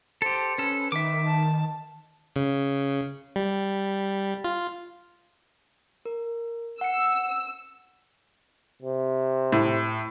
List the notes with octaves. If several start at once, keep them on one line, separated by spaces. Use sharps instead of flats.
G4 A4 C5
C#4 A4 B4
D#3 E5 D6
A5
C#3
G3
F4
A#4
F#5 E6 C#7
C3
A2